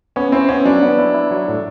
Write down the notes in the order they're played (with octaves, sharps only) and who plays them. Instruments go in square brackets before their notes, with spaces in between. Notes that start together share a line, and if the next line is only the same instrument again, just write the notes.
[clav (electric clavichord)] B3 [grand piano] C#4
[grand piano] C4 [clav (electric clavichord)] E4
[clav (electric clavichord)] B3 [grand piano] C#4
[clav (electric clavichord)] F#3 [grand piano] D4
[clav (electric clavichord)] B3
E4
E4
F#3
A2